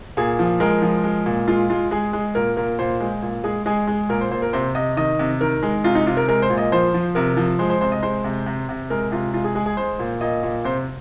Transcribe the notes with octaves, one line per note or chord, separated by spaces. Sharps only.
A#2 G#4
F3
G#3 A#4
F3
G#3
A#2
G#3 F4
G#3 F4
G#3 G#4
G#3
A#2 A#4
A#2 A#4
A#2 C5
G#3
A#2
G#3 G#4
G#3 G#4
G#3
A#2 A#4
C5
A#2 C5
A#4
C3 C5
C3 D#5
D#3 D#5
C3
D#3 A#4
G#3
C3 F4
D#4
C3 F4
A#4
G#3 A#4
C5
A#2
D#5
F3 C5
F3
C3 A#4
F3
G#3 C5
C5
C3 C5
D#5
G#3 C5
C3
C3
C3
G#3 A#4
C3 F4
G#3 F4
G#4
G#3 G#4
G#4
G#3 C5
A#2
A#2 D#5
A#2
C3 C5